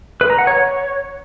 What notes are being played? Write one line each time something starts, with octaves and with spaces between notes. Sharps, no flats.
B4
A#5
F#5
C#5